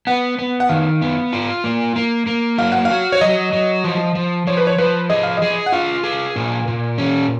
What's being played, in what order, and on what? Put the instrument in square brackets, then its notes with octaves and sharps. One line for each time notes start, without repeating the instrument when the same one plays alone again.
[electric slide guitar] B3 [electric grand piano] F#5
[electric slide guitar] B3
[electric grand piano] F#5
[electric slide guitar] D#3 [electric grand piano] F5
[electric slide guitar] B3
F4
A#3
A#3
A#3
[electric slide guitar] F#3 [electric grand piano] F5
[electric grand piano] F#5
F5
[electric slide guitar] F#4
[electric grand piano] C#5
[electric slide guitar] F#3 [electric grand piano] D#5
[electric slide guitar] F#3
F3
F3
[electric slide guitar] F3 [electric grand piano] C#5
[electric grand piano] B4
C#5
[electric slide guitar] F3 [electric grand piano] B4
[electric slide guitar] G#4 [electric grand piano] D#5
[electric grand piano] F5
[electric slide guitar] G#4 [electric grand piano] D#5
[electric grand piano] F#5
[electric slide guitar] F4 [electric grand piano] F5
[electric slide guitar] G#4
A#2
A#2
C#4